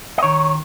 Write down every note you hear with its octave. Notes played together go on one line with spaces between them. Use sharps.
D#5
D#3 C#5